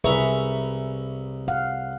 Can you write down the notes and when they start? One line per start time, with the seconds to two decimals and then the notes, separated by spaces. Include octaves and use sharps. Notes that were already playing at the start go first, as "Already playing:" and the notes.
0.04 C2 G#4 B4 E5 A#5 C#6
1.48 F5 F#5